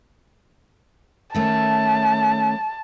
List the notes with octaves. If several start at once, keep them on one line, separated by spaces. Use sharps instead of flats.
D#3 A3 C#4 A5